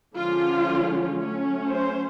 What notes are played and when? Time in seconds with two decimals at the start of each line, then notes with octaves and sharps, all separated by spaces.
0.15 D3 F3 G#3 C#4 F4
1.17 F#3 A3 C#4
1.68 C5